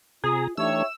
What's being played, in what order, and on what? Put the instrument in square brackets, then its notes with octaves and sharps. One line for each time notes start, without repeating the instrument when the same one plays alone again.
[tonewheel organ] C3 A#5 [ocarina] F4 [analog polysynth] G#4
[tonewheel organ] E3 A3 D4 [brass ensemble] D#4 G4 C#5 [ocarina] E5 [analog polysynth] E6